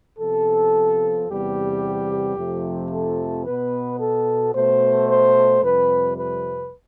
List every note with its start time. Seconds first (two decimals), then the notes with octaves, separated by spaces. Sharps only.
0.19 C3 F3 B3 A4
1.28 E2 C3 G3 B3 G4
2.37 F2 C3 F3 A3
2.91 A4
3.45 B2 B3 B4
4.00 A4
4.54 B2 A3 C5
5.09 C5
5.63 F2 C3 G3 B4
6.18 B4